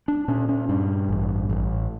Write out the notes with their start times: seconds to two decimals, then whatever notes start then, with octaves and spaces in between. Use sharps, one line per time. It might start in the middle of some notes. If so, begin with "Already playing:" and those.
0.08 D4
0.28 A#2 C#4
0.49 C#4
0.69 G2 D4
1.09 A1
1.50 A1